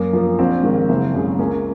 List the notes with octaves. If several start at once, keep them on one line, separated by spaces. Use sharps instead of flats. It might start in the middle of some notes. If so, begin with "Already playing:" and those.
Already playing: F#2 A#3
F3 A#3
A#1 C4
G#2 D#3 A#3
F#1
F#2 C#3 G#3
C#2 A#3 C#4